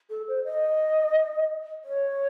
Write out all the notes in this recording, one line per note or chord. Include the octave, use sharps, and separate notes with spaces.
A4
C5
D#5
C#5